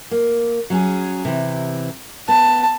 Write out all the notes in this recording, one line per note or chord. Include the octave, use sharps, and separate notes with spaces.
A#3
F#3 C#4 G#4
C3 E3
B3 A5